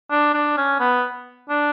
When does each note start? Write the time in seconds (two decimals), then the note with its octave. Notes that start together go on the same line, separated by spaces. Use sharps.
0.11 D4
0.34 D4
0.57 C#4
0.80 B3
1.49 D4